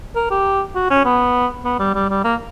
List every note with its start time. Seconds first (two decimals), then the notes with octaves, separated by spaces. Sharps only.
0.15 A#4
0.30 G4
0.75 F#4
0.90 C#4
1.05 B3
1.65 B3
1.79 G3
1.95 G3
2.10 G3
2.24 A#3